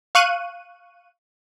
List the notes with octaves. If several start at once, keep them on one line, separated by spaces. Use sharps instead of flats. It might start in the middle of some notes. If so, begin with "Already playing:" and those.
F5 C#6 F#6 D#7